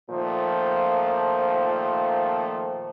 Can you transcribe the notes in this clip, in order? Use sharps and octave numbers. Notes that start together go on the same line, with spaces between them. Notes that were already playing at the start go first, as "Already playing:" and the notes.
A#2 D#3 F3 A3 C5